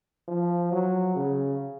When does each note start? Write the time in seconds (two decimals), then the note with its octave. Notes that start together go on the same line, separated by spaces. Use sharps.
0.28 F3
0.72 F#3
1.16 C#3